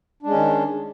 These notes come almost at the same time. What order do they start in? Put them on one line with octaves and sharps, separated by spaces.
D4 G#3 C#4 D#3